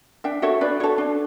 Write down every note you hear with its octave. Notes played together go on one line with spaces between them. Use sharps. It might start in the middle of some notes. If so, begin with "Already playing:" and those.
D4 E5 G5
F#4 A4 C#5 E5
D4 B4 D5
F#4 A4 C#5
D4